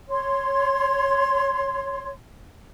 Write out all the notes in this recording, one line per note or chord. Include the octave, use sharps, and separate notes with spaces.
C#5 C6